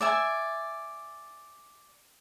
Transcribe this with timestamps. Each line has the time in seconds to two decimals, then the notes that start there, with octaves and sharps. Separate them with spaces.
0.01 D5 E5 G#5